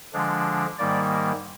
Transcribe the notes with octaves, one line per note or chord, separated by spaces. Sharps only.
D3 F3 G#3 D4
G#2 D#3 G3 A#3 D5